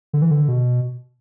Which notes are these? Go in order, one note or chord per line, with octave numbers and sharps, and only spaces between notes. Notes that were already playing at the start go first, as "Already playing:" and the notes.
D3
E3
D3
B2